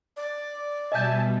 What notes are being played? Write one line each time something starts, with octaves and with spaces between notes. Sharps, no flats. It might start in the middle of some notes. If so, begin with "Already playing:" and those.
D5
B2 G3 D#5 E5 G#5 A5 G6